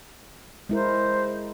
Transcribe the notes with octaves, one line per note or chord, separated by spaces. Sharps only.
G#3 E4 A#4 C5